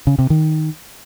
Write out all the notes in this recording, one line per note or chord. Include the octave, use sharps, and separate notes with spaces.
C#3
C3
D#3